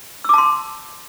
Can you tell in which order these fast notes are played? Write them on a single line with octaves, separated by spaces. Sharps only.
E6 D6 A5 C6